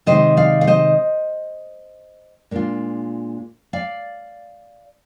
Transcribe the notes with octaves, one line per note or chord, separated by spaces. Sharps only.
C3 D#3 G#3 D#4 C5 D#5
D5 F5
F5
C5 D#5
A#2 G#3 D4 F4
D5 F5